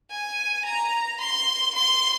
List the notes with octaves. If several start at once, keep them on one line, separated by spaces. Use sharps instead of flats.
G#5
A#5
C6
C6